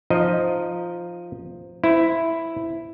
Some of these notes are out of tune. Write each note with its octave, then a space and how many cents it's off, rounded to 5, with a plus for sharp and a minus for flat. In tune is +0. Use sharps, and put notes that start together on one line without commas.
F3 +0 D#4 -15 D#5 +0
E4 +0 C5 -25